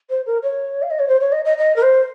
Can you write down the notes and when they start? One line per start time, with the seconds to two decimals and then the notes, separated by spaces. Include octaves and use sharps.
0.09 C5
0.26 A#4
0.43 C#5
0.82 F5
0.90 D#5
0.99 C#5
1.08 C5
1.20 C#5
1.32 D#5
1.45 D#5
1.58 D#5
1.76 A#4
1.82 C5